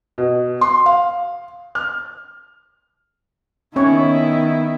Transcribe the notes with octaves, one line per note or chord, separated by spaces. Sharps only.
B2
C6
F5
F6
D#3 B3 C#4 E4 C#5